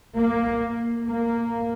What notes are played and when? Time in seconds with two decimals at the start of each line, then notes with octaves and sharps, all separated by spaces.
0.16 A#3
1.07 A#3